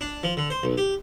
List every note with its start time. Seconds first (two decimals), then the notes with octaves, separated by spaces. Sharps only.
0.01 D4
0.23 F3
0.37 D3
0.50 C5
0.63 B1
0.78 G4